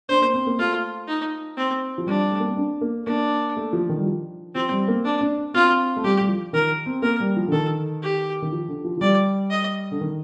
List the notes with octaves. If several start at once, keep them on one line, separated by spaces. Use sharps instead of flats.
D4 C5
A#3
C4
A#3
A3 F4
D#4
C4
F3
G3 D4
A3
A#3
C4
D4
A#3
A#3 D4
A3
F3
D#3
G3
F3
F3 C4
G3
A#3
D4
D4
C4 F4
A3
G3 G4
G3
F3
D#3 A#4
C4
A#3 A#4
G3
F3
D3
D#3 A4
G4
D#3
F3
D3
F3
F3
G3 D5
D#5
D3
D#3